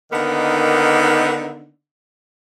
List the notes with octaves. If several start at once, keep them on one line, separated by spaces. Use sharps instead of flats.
D3 D#3 A#3 B3 D#4